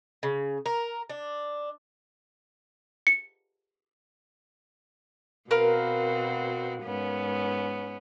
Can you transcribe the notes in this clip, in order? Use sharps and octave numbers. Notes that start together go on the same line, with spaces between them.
C#3
A#4
D4
C#7
B2 C4 F#4 A#4 B4 F5
G#2 B3 C#4